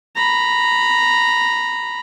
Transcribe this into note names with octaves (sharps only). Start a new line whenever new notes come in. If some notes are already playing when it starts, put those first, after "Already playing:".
A#5 B5